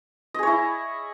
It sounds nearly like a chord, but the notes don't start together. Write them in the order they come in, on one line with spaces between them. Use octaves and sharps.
D#5 G#4 C#5 E4